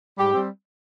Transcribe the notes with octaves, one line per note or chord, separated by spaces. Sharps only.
G#2 G3 G4
G3 C4